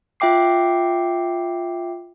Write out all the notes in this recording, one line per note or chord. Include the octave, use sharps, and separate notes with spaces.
F4 E5 G5 D6 C7